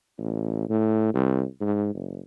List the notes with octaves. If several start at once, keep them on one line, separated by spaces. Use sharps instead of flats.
A1
A2
C2
G#2
F#1